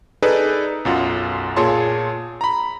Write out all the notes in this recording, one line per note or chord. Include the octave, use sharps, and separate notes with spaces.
D#4 G#4 A4 B4 D5
B1 F#2 F4 F#5
A#2 F4 G#4 C#5 A5 C6
A#5 B5